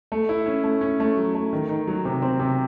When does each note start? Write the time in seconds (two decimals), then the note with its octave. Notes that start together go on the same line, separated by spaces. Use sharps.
0.12 A3
0.29 E4
0.46 C#4
0.64 A3
0.81 C#4
1.00 A3
1.17 F#3
1.35 A3
1.53 D#3
1.69 D#3
1.87 F#3
2.05 C3
2.22 C4
2.39 C3